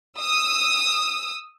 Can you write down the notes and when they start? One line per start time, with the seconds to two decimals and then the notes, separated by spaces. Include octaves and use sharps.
0.19 D#6 E6